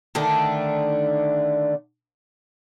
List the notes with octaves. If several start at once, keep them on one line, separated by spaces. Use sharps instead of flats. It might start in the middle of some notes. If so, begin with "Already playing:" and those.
D3 D#3 A3 D4